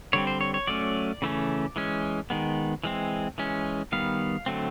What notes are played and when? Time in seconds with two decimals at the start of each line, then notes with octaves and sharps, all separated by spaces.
0.13 D3 G3 C4 C#5
0.27 C5
0.41 C#5
0.54 C#5
0.67 F#3 A3 C#4 D5
1.22 C#3 E3 A3 C#4
1.76 E3 G#3 C#4
2.30 D#3 G#3 B3
2.83 E3 G#3 C4
3.38 E3 G#3 C#4
3.92 D#3 G3 B3 F5
4.46 D3 F#3 A3 C4